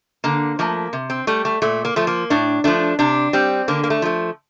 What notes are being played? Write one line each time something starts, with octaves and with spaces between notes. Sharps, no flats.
D3 A#3
F3 A3 A#3
C3
C4
G3 A3
A3
A#2 A3
A#3
F3 A3
A#3
A2 D4
F3 A3 D4
C3 D4
G3 C4
D3 A#3
A#3
A3
F3 A3